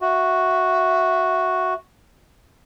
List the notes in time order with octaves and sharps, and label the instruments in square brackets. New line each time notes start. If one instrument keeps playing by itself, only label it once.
[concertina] F#4 [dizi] E5